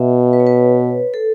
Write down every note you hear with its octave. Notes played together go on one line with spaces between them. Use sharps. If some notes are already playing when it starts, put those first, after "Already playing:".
Already playing: B2 E5
B4
C#5
B4
A4